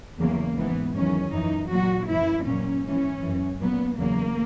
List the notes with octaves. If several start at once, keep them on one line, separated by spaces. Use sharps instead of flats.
E2 C#3 F#3 A#3
G#2 E3 B3
E2 D#3 F#3 C#4
F#2 E3 D#4
A#2 F#3 F#4
F#2 E3 E4
A#2 F#3 C#4
G#2 E3 C#4
F#2 E3
A#2 F#3 B3
E2 C#3 F#3 A#3